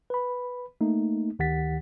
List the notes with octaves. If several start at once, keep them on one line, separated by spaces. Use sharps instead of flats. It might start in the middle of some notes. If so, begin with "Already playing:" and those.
B4 B5
A3 A#3 D#4
D2 D#3 G4 F#5 A6 B6